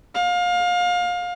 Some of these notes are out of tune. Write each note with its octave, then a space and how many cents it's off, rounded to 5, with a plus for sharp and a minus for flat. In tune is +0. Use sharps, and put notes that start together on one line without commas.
F5 +25